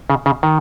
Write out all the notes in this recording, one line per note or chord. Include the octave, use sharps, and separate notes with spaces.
C#3
C#3
D#3